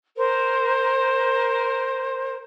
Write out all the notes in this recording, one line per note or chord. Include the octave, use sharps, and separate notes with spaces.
A#4 C5